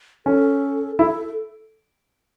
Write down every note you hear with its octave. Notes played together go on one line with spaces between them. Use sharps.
C#4 A4
E4 A4